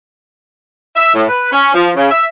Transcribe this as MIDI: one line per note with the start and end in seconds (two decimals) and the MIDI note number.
0.96 1.12 76
1.15 1.24 45
1.29 1.52 71
1.52 1.71 61
1.74 1.89 53
1.96 2.10 49
2.11 2.24 76